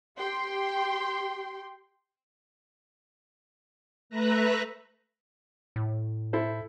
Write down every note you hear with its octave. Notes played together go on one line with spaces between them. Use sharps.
G4 G5 C6
A3 B4 E5 A#5 F#6 A#6
A2
E4 A4 C5